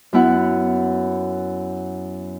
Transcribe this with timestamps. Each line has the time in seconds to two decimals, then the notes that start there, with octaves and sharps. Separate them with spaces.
0.13 F#2 B3 E4 F#5